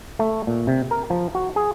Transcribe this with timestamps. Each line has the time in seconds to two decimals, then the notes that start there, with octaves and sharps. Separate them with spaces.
0.19 A3
0.47 A#2
0.67 C3
0.91 A#4
1.10 F3
1.35 F#4
1.56 G#4